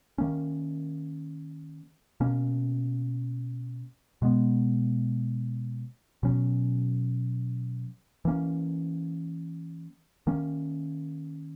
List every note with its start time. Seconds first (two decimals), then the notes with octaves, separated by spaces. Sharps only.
0.18 D#3 A#3 C#4
2.20 B2 A#3 C#4
4.22 B2 G#3 B3
6.23 B2 F#3 C#4
8.25 E3 A#3 C#4
10.27 D#3 A#3 C#4